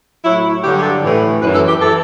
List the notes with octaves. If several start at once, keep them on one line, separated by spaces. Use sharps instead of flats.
A2 F#3 E4
G2 D3 F#3 G4
G4
A4
A2 E3
F#2 E3 B4
A4
G4
E3 A4